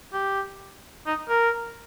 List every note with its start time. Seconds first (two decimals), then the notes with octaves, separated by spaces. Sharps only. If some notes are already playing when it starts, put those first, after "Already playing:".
0.13 G4
1.06 D#4
1.29 A#4